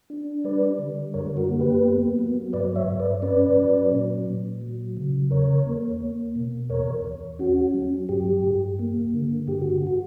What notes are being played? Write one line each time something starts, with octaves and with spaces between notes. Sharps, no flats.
D4
G3 B4 D5
D3
F#2 A#4 C#5
F#4 A#4
A#3
G4 B4
B3
F#3
G2 B4 D5
C#5 E5
G2
B4 D5
C#4 B4 D5
F#3
A#2
A#2
F#3
C#3
E2 A#4 C#5
A#3
A#3
B2
E2 A#4 C#5
E2
C#4 F#4
F#3
G2 G4
G2
A#3
D3
G2 G4
F#4
F#4